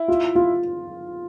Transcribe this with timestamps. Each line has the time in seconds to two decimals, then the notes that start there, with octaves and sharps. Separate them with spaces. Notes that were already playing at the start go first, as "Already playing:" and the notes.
Already playing: E4
0.08 F4
0.35 F4